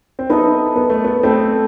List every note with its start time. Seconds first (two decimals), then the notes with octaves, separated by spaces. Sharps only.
0.19 C4
0.30 B3 D#4 E4 A4 D#5
0.76 B3
0.90 A3
1.04 B3
1.23 A3 C4 E4 A4 D#5